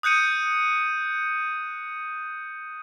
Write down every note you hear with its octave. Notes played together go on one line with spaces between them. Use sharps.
D#6 F#6 G6 C#7 D#7